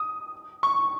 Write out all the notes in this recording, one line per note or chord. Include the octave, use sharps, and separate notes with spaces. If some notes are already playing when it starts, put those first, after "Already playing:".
Already playing: D#6
C#6